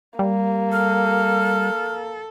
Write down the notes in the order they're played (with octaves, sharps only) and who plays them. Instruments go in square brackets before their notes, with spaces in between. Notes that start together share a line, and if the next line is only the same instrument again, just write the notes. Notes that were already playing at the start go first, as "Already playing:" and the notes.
[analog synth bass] G3 [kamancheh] A#3
[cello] A4 [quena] F6